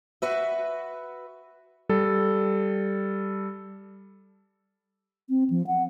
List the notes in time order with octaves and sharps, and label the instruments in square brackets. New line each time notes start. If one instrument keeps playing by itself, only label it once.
[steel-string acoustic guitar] F#4 B4 E5
[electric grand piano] G3 A4
[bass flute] C4
F3
F#5